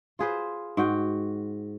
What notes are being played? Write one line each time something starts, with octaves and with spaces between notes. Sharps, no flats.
F4 G#4 B4 C5
G#2 F#4 G5